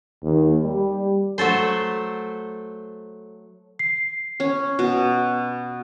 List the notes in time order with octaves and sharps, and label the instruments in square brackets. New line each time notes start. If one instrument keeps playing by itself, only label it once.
[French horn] D#2
G3
[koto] F#3 A3 A4 C5
[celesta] C7
[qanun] C#4
B2